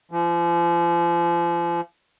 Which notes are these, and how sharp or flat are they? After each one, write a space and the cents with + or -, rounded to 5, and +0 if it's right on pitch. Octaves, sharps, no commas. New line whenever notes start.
F3 -35